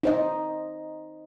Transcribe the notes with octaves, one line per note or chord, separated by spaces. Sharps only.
D#4 C5 D#5